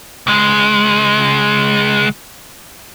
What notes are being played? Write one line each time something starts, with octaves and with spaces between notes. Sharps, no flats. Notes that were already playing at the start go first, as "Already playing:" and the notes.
C#2 G#3